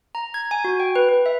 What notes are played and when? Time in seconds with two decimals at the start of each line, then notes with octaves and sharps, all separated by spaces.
0.15 A#5
0.34 G#6
0.51 G#5
0.64 F#4
0.80 G5
0.96 B4
1.09 B4
1.26 E5